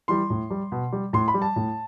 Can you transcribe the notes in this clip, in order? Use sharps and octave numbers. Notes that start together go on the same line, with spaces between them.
E3 G3 C6
A2
G3
B2
G3
A2 C6
B5
G3
A5
A2